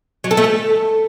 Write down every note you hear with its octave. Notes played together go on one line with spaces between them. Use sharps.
F#3
A4
A3
A4